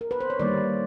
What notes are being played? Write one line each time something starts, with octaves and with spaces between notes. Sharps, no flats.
A#4
B4
C5
C#5
D#3 G3 A#3 D5